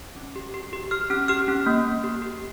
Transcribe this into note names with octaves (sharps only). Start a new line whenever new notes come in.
C#4
G4
G4
G4
G4 F6
C#4 F6
G4 F6
C#4
A#3
A#3
G4
G4